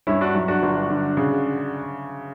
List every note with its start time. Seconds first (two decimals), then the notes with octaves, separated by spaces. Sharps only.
0.07 G2 C#4 E4
0.21 D4 F#4
0.35 F#3
0.48 D4 F#4
0.63 G1
0.90 D3
1.17 C#3